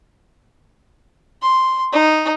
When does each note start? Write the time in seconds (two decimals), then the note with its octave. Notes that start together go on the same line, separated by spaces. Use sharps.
1.42 C6
1.93 D#4